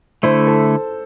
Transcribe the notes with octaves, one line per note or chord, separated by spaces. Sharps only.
D3 A3 E4 C5
A4